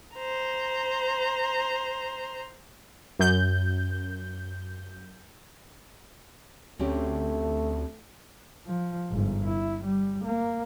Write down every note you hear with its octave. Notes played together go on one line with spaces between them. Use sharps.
C5 A#5
F#2 G6
D2 A3 C4 C#4 G4
F3
G1 G#2
E4
G3
A#3